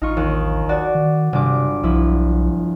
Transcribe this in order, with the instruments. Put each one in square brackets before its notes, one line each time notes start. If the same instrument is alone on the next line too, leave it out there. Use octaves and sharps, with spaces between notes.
[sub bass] A1 [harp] D#4 F4 C#6
[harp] D#2
F#4 D5
[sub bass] D#3
[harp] G1 D6 [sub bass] C3
[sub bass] B1 [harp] F3 E4